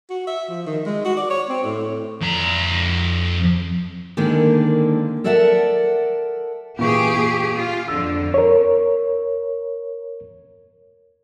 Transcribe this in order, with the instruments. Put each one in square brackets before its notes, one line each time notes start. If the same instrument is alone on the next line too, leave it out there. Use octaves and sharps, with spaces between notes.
[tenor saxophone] F#4
E5
F3
D#3
G#3
F#4
D5
C#5
C4
A2
[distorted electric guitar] F2 A#5
[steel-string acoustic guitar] D3 D#3 G#3 A#3 C4 D4
A4 A#4 D5 E5 F#5 A5
[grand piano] A#2 E3 C#6 [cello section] G4 G#4
[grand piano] A#2 C#6
[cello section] F4
[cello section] F2 D3 [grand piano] E6
[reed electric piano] A#4 C#5